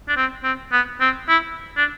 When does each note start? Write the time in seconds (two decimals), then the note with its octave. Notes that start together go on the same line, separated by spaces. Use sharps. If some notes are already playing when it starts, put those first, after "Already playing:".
0.08 D4
0.17 C4
0.43 C4
0.72 B3
1.01 C4
1.29 E4
1.77 D4